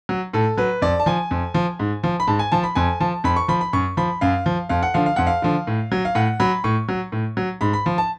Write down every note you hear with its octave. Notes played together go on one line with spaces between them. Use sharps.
F#3
A2 A4
F#3 B4
F2 D5
A5
F3 G#5
F2
F3
G#2
F3
B5
G#2 A5
G#5
F3 A5
B5
F2 G#5
F3 A5
F2 B5
C#6
F3 B5
B5
F#2 C#6
F3 B5
F#2 F5
F3
F2 F5
F#5
D3 F3 F5
F5
F2 F#5
F5
D3 F3
A2
F#3
F5
A2 F#5
F#3 B5
A2 C#6
F#3
A2
F#3
G#2 B5
B5
F3
A5